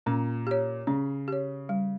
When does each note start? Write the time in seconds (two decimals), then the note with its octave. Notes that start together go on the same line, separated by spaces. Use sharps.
0.06 A#2 C#4
0.47 G4 C#5
0.87 C#3 C#4
1.28 G4 C#5
1.69 G3